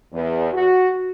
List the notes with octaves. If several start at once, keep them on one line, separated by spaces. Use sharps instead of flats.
E2
F#4